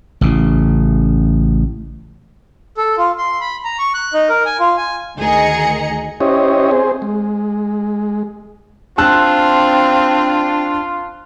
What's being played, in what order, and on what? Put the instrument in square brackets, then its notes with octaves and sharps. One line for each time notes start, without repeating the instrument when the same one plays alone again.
[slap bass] A1 C#3
[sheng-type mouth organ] A4
F4
C6
B5
A#5
C#6
F#6
D#4
A#4
G#5
F4
G#5
[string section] D2 D#3 G#4 D#5 A#5 C#7
[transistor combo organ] C#4 E4 G4 C5 C#5 D#5
C4 G#4 C5
G#3
[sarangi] C4 [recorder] D4 [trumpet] F4 [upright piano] A5 E6 F#6